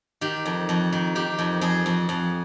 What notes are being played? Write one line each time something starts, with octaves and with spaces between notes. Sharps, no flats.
D#3 G4
F2
F2
D#3
D#3 G4
F2
F2 G#4
F2
F2